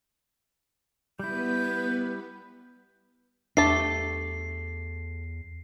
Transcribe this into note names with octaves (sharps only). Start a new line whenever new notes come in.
G3 B3 E4 B4 G6
E2 A3 D4 G4 A5 C7